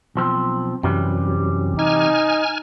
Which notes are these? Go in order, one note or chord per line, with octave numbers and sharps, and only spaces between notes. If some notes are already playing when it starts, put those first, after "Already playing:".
B1 F3 C4
F#2 C3 E3 G3
D#4 G#5 F6